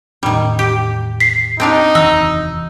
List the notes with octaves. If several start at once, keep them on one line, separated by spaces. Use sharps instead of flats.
E2 A2 D#3 G3 C#4
G4
B6 C7
C4 D4 D#4 F5
F1 D#2 E3 F#4 E6